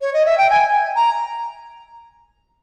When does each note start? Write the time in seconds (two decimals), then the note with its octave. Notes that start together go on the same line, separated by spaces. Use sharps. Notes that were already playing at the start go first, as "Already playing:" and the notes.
0.01 C#5
0.13 D#5
0.26 E5
0.38 G5
0.50 G#5
0.96 A#5